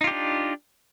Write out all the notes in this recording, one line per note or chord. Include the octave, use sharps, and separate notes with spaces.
D4 D#4 F4 G4